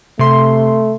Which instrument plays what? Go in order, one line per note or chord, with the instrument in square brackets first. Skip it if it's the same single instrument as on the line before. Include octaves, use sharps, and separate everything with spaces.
[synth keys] C3 C6 [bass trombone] A3